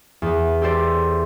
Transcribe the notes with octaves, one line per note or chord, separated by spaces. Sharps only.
E2 B3
G4 A4 C5 D5